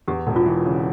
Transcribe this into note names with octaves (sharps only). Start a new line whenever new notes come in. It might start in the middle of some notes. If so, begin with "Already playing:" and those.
E2 G4
E1
F4
E3
C#3